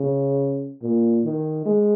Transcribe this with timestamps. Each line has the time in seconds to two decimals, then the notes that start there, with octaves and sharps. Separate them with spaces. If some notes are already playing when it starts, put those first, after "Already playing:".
Already playing: C#3
0.82 A#2
1.24 D#3
1.65 G#3